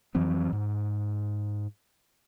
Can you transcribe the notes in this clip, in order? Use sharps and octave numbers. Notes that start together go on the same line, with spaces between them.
F2 E3 F#3 C4
G#2